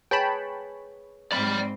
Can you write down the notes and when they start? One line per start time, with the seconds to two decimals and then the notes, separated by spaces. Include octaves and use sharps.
0.11 G#4 B4 C#5 G5 A5 B5
1.32 G#2 C4 D5 B5